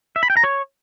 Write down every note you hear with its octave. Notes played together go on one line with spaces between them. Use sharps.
E5
B5
G5
A#5
C#5